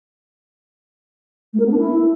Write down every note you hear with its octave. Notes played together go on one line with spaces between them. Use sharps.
A3
A#4
B3
D4
E4